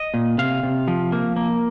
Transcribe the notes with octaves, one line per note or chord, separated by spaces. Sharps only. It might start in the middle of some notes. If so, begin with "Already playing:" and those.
Already playing: D#5
A#2
C3 F5
C3
F3
A#3
A#3